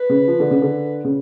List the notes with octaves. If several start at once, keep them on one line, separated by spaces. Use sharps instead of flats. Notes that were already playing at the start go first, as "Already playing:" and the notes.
Already playing: B4
C#3
F3
D3
C#3
D3
C#3